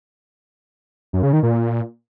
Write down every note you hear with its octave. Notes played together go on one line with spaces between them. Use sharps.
F#2
C#3
D#3
A#2